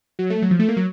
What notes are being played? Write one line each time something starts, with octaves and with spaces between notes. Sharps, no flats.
F#3
A3
F#3
F3
A3
A#3
F#3